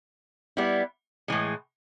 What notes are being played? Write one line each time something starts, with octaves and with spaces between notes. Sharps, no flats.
G3 B3 E4
A2 E3 G#3